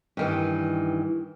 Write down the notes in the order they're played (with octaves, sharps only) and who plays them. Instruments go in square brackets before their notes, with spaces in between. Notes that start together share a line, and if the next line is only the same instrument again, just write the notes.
[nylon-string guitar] G2 D#3 E3